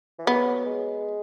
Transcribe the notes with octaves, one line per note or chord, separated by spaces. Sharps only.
E3
F#3 B3
G#3